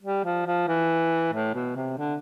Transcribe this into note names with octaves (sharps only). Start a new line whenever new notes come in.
G3
F3
F3
E3
A2
B2
C3
D3